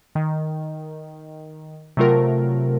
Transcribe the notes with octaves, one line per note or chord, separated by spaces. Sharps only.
D#3
C3 F#3 A3 F4 A#4